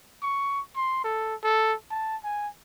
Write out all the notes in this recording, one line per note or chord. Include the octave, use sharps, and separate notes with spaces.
C#6
C6
A4
A4
A5
G#5